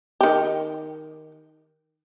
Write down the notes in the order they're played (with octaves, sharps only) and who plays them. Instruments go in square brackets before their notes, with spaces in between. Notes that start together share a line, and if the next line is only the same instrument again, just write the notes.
[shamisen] D#3 G4